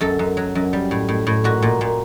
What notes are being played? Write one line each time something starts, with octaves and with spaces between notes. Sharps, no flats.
F#2 A4
F#2
F#3
F#2
G3
A2
A2
A2
A#2 F#4
A#2
A#2